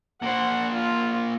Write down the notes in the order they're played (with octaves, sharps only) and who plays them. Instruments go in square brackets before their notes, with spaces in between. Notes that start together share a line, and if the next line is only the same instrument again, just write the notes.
[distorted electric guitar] A#3 C5 [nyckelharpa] F#5
[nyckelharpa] F4